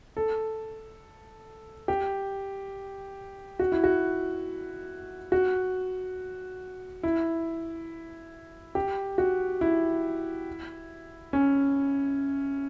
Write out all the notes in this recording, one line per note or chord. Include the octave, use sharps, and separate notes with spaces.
A4
G4
F#4
E4
F#4
F#4
E4
G4
F#4
E4
C#4